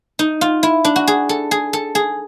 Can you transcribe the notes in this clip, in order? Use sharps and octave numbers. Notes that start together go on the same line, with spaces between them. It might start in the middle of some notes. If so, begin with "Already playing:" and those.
D#4
F4
E4
D4
F#4
G#4
A4
G#4
A4
G#4